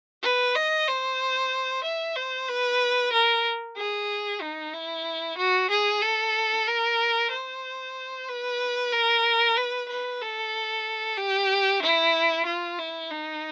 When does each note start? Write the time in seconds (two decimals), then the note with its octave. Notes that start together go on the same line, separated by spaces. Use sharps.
0.23 B4
0.55 D#5
0.87 C5
1.84 E5
2.16 C5
2.48 B4
3.12 A#4
3.77 G#4
4.41 D#4
4.73 E4
5.38 F#4
5.70 G#4
6.02 A4
6.67 A#4
7.31 C5
8.28 B4
8.92 A#4
9.57 B4
9.89 B4
10.21 A4
11.17 G4
11.82 E4
12.46 F4
12.78 E4
13.11 D#4